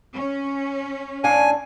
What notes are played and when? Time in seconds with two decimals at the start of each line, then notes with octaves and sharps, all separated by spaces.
0.15 C#4
1.24 A2 D4 F5 G#5